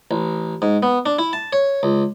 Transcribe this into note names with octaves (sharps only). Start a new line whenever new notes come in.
A1
G#2
B3
D4
E4
A5
C#5
C#2